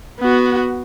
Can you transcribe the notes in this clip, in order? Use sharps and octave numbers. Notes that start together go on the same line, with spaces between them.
B3 F#4